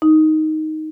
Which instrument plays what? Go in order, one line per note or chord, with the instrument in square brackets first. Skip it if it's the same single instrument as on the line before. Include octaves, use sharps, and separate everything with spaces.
[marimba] D#4